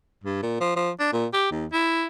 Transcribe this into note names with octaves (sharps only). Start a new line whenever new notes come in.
G2
A#2
F3
F3
D4
A#2
G4
D#2
E4